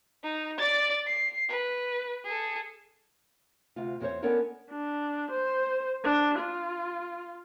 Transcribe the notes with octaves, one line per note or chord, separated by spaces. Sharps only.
D#4
D5 A6
C7
B4
G#4 A4
D2 C3 F4
E2 C4 C#4 A4 C5 C#5
B3 C#4 D4 A4 A#4 C#5
D4
C5
D4
F4